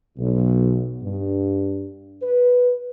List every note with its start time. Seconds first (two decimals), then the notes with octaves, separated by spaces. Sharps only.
0.18 B1
1.03 G2
2.22 B4